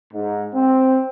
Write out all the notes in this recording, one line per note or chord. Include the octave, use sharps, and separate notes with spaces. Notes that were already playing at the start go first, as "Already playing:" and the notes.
G#2
C4